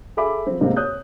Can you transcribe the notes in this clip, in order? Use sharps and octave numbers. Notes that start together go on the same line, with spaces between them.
G#4 A4 E5 B5 D6
F3 C4
F1 G#2 C3 A#3 C4 F5
C#5 D#6 F#6 G6